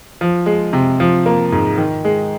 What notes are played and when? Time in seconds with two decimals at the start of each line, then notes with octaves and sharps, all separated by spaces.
0.21 F3
0.46 G#3
0.73 C3
1.00 F3
1.26 A#3
1.52 G#2
1.78 D#3
2.05 G#3